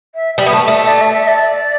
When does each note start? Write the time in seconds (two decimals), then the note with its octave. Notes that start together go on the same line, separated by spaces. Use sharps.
0.15 E5
0.38 G3 E5
0.46 B3
0.53 A3
0.68 A3
0.74 E5
0.88 D5
1.01 E5
1.20 E5
1.28 D5